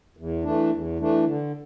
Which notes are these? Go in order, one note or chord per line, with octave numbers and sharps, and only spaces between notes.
E2
E3 A3 D4
E2
E3 A3 D4
D3